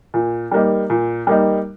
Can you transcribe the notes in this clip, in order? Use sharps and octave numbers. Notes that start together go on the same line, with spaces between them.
A#2
G3 A#3 D#4
A#2
G3 A#3 D#4